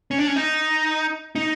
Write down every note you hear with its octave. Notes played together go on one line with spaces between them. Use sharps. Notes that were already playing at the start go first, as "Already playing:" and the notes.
C#4
D4
C#4
D#4
D#4